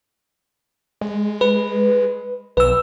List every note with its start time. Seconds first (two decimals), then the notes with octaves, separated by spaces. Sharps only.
1.01 G#3
1.41 B4
2.57 B1 B4 E6